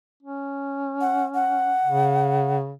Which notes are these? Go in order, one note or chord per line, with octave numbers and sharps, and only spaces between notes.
C#4
F#5
F#5
C#3